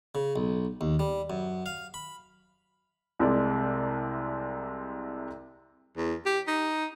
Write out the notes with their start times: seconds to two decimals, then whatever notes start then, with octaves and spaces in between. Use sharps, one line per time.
0.15 C#3
0.36 B1
0.81 D#2
0.99 G3
1.30 F#2
1.66 F5
1.94 B5
3.19 C2 C3 G#3 D5
5.97 E2
6.26 G4
6.47 D#4